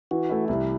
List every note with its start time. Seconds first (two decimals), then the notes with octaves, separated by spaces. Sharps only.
0.11 E3 F#4
0.29 A3 E4
0.48 C2 E4